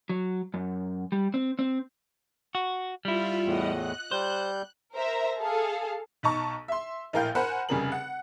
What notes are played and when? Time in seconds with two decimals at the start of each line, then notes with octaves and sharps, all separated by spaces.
0.09 F#3
0.54 F#2
1.12 G3
1.34 C4
1.59 C4
2.55 F#4
3.05 G3 E4 F4
3.46 E2 A2 D#5 F#5
3.76 F#6
4.11 G3 C5 G6
4.94 A#4 C5 E5 A#5
5.38 G#4 A4 F5 A5
6.23 B1 D#4 A5 A#5 C#6
6.68 E5 C6
7.13 A#1 A2 A#4 F5 G5 G6
7.35 A#4 C5 F#5 G#5 B5
7.69 F1 C#3 G3 G#4 A#4 F#7
7.92 F#5